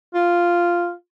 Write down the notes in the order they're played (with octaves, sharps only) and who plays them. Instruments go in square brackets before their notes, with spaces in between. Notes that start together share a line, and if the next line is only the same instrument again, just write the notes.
[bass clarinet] F4